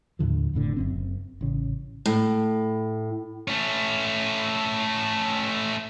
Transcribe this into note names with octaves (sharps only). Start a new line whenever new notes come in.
D#2 A2 D3 F3
D1 F2 A2 D3
F#1 F#2 C4
A1 C#3
A2
A3 C#4